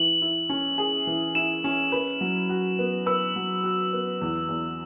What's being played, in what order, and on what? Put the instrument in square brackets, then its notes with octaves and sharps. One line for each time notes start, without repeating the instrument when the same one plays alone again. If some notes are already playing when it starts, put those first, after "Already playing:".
Already playing: [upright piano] E3 [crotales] F#7
[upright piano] E4
C#4
G#4
E3
[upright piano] E4 [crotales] E7
[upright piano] C#4
B4
F#3
F#4
B3
[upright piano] B4 [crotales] E6
[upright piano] F#3
F#4
B3
E2
E2